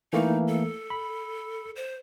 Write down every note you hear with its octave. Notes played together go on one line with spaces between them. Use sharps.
E3 A3 A#3 D#4
A4
B5
C5